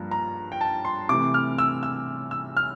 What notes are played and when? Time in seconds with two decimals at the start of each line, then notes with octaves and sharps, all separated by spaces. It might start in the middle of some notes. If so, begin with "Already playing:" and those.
Already playing: G2 F3 A#3
0.11 A#5
0.52 G5
0.61 A5
0.85 C6
1.09 C3 E3 A3 D6
1.34 F6
1.58 E6
1.83 E6
2.31 E6
2.57 F6